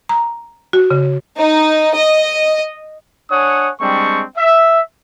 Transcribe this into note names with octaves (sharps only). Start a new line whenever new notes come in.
A#5
F#4
C#3
D#4
D#5
D4 C#5 F#5 G#5 D#6
G3 G#3 C4 D4 C#6
E5